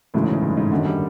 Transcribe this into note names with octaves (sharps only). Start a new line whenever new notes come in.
E1 D2 A2 C#3 E3 G#3
G#2
G#2
G2
G#2
F#1 F#2 D3 D#3
G3